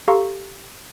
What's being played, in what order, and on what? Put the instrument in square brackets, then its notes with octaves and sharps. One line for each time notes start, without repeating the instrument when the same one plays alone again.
[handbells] G4 A4 F5 A#5 C6 C#6